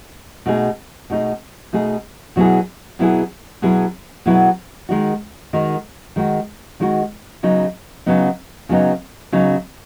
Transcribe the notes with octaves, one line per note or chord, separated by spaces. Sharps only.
B2 A3 D#4 G#4
B2 A3 D#4 G#4
B2 A3 D#4 G#4
B2 F#3 B3 E4 G#4
B2 F#3 B3 E4 G#4
B2 F#3 B3 E4 G#4
B2 F#3 B3 E4 G#4
D#3 G#3 D#4 F#4
D#3 G#3 D#4 F#4
D#3 G#3 D#4 F#4
D#3 G#3 D#4 F#4
C#3 F#3 B3 D#4
C#3 F#3 B3 D#4
C#3 F#3 B3 D#4
C#3 F#3 B3 D#4